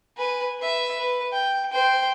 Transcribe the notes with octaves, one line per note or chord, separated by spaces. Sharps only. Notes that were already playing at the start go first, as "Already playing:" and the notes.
B4 G#5
B4 E5
B4
G5
C5 G5